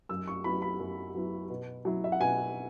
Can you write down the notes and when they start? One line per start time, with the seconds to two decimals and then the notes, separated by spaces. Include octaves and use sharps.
0.09 F#2 E6
0.28 C#6
0.44 F#3 B3 E4 B5
0.62 B5
0.80 F#2
1.15 F#3 B3 E4
1.50 B2
1.85 F#3 E4
2.04 E5
2.12 F#5
2.20 B2 G#5